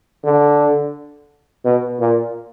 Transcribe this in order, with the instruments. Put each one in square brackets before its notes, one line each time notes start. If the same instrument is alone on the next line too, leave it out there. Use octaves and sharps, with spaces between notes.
[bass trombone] D3
B2
A#2